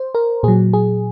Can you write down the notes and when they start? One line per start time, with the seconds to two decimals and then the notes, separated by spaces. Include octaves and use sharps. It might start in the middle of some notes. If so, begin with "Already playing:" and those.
Already playing: C5
0.15 A#4
0.43 A#2 G#4
0.48 F#3
0.73 G#4